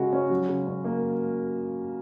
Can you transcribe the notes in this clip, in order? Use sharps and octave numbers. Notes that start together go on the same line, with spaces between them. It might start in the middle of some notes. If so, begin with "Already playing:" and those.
Already playing: C#3 G#3 F#4
C#4
F#3
C#3
C#4
A#3